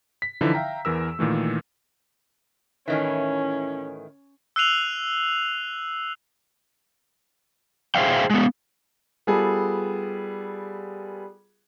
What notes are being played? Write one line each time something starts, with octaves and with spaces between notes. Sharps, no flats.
B6
D3 E3 F3 D#4 E4
E5 F5 G5 A#5
E2 E3 A#4 E6
A#2 D#3 E3 A3
A2 D#3 E3 C#4
E6 F#6 C7 D#7 F7 F#7
G#4 C5 D5 E5 F5 G5
G#3 B3
G3 B3 F4 G#4 A4